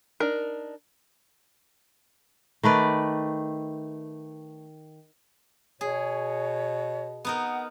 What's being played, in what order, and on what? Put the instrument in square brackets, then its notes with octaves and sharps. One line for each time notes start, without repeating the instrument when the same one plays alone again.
[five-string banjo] D4 D#4 A#4
[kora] D#3 A3 B4 D5
[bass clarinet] B2 [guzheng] G#4 [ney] C#5
[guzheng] B3 D#4 A#4 [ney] F#5